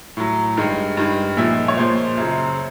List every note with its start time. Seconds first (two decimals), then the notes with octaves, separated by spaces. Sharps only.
0.17 A2 F#3
0.57 G2 D#3 G#3
0.97 G2 D#3 G#3
1.37 A#2 F3 G#3 E5
1.68 C#5
1.77 A#2 F3 G#3 C5
2.17 F#2 C#3 F#3